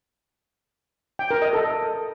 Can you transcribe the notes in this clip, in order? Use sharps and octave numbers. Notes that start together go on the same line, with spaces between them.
G5
A#4
D#5
A4